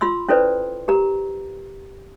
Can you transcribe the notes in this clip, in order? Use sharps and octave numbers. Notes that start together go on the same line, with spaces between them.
F4 B5 C6 E6
C#4 E4 A4 B4 C5 D5
G4 A#4 A#5